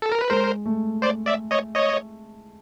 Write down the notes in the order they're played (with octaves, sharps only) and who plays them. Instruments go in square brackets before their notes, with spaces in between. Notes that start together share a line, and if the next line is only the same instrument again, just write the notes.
[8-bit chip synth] A4
A#4
B4
[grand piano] G#3 [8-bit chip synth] A#4 C5
[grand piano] A3
[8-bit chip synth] C5 D5
D5 E5
C#5 D#5
C#5 D#5